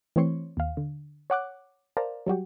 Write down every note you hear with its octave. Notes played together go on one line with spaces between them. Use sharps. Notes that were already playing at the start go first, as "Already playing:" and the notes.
E3 A3 C4 C#5 C6 C#7
D#2 F5
D3
C#5 F#5 D6 F#6
A#4 C5 D5 F5 A5 A#5
F#3 G3 F#4 G4